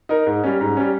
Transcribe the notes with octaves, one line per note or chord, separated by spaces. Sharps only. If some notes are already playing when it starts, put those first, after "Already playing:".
D#4 A#4
G#2
G3 C#4
G#2
G3 C#4